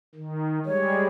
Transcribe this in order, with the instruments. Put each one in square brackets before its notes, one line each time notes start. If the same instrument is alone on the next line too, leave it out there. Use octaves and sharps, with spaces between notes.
[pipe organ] D#3
[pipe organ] G3 G#3 [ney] C#5